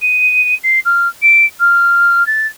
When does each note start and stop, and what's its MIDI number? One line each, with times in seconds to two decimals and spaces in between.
0.02 0.54 99
0.63 0.79 96
0.85 1.08 89
1.22 1.45 98
1.60 2.26 89
2.26 2.47 93